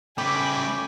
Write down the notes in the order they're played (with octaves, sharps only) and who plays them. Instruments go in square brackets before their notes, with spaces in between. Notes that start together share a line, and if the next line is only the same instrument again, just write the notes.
[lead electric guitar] C#3 A3 [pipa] G4 [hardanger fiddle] G5 G#5 [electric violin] B5 D6